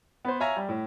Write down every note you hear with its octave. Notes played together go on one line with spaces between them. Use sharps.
B3 C5
C#5 E5 F5 G#5 A#5
G3
A2